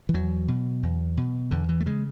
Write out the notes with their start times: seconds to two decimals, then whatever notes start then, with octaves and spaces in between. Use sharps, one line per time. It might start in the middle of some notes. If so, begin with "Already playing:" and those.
0.09 E3
0.14 E2 F#3
0.48 B2
0.83 E2
1.17 B2
1.51 E2 D3
1.69 E3
1.80 A3
1.86 C#3 G#3